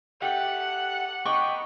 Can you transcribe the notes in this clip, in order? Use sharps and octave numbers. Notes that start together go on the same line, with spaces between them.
A3 G4 F#5
B3 D#4 G5 C#6 D6